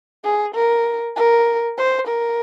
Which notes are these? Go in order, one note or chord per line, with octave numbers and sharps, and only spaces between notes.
G#4
A#4
A#4
C5
A#4